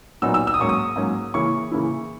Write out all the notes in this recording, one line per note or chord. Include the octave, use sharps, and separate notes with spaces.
A#2 F#3 B3 D#4 E6
E6
E6
D#6
G#2 F#3 A#3 C#4 C#6
D#6
G#2 F#3 A#3 C#4
C#3 E3 A#3 C#4 E4 C#6
C#3 E3 A#3 C#4 E4